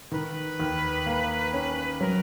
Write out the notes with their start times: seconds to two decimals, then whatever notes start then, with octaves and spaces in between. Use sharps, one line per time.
0.11 D#3 B4
0.60 D#2
1.06 A#3
1.54 C#4
2.00 F#3 A#4